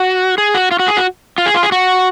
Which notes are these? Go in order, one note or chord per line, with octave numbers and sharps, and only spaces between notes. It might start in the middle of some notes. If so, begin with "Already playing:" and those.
Already playing: F#4
G#4
F#4
F4
F#4
G#4
F#4
F4
G#4
F4
G#4
F#4